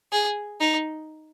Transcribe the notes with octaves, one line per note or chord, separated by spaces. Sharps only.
G#4
D#4